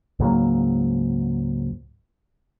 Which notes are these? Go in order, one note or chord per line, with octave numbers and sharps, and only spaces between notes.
C#2 G#2 F#3 A#3